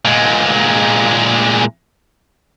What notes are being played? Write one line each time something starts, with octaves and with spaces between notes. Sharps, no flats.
A#2 G#3